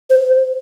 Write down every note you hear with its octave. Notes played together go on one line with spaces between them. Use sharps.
C5